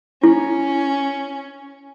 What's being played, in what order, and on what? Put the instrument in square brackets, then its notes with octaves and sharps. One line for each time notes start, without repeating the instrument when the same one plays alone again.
[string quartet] C#4 [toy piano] E4